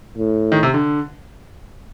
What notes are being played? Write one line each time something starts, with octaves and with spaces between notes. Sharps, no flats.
A2
D#3
C3
D3